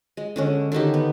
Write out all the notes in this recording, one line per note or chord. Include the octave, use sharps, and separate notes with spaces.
G#3
D3 G#3 C#4
D3 D#3 D#4 G4
B3